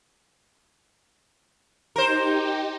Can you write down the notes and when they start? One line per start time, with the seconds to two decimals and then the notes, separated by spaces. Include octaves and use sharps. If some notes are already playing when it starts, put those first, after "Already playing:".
1.96 D#4 G4 A#4 C5